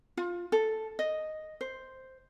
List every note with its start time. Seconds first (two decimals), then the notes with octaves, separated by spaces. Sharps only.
0.17 F4
0.52 A4
0.99 D#5
1.61 C5